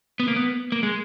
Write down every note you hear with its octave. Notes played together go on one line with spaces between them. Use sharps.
B3
A#3
B3
A#3
G#3